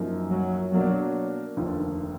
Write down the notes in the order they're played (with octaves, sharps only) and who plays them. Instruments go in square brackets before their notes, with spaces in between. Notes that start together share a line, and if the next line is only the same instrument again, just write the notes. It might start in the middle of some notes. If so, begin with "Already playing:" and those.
Already playing: [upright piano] F#2 F3 A#3 D#4
[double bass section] F#3
[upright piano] B2 A#3 D4 [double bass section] F#3
[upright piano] F1 D#2 D3 F3